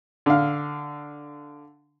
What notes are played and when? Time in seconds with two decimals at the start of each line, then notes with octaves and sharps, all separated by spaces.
0.26 D3 F5